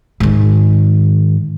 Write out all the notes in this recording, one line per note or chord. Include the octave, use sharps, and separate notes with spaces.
G#2 D#3